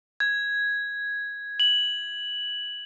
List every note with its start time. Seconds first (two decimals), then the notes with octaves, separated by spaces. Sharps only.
0.20 G#6
1.60 F#7